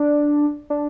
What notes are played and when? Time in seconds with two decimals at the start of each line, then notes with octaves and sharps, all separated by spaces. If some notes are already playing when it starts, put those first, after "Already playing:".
Already playing: D4
0.70 D4